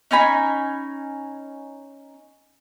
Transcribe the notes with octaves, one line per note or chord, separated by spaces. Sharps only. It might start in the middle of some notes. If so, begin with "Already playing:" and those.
C#4 D#4 G#5 B5